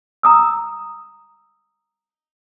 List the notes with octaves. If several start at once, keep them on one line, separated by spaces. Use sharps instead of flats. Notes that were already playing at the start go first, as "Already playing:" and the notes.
A#5 D#6 E6